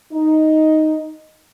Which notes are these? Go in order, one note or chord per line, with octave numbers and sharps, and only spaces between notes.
D#4